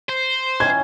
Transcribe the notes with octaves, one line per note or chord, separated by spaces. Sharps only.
C5
D#3 C#4 E4 G#6